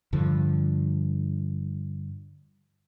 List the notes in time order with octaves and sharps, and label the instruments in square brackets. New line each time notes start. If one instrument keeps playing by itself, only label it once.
[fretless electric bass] G2 D3 F3